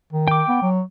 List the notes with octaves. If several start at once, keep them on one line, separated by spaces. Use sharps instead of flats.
D#3
G5 D6
B3
F#3